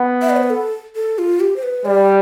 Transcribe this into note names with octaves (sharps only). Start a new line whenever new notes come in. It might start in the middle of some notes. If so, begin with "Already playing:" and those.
Already playing: B3
E5
D5
C5
B4
A4
A4
F4
G4
C5
B4
G3 D5